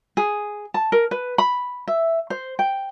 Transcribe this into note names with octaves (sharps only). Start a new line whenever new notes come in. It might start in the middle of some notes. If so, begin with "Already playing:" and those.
G#4
A5
A#4
B4
B5
E5
C5
G5